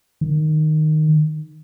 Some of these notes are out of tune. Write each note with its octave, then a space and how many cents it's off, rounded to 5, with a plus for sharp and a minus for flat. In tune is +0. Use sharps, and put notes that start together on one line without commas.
D#3 -10